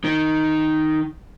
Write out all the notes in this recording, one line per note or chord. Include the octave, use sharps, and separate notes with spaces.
D#3